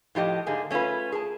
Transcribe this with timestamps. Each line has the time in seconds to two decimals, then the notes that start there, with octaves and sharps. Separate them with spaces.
0.15 A2 F3 G4 D#5
0.46 G#2 D3 A#3 G#4
0.70 A3 C#4 D4 F4 B4
1.12 G#4 A#4 A5